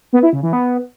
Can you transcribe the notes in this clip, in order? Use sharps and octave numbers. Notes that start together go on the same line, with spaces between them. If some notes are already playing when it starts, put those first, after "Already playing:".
B3
E4
C#3
E3
B3